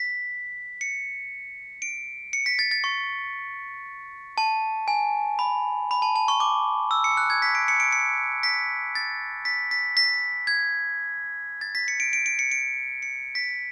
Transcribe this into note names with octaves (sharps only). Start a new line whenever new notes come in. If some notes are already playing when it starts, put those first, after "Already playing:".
Already playing: B6
C#7
D7
C#7
B6
A6
A6
C#6
A5
G#5
B5
B5
A5
A5
C#6
D6
E6
C#7
F#6
G#6
B6
D7
C#7
D7
C#7
B6
A6
B6
B6
B6
G#6
A6
B6
C#7
D7
D7
D7
C#7
D7
C#7
B6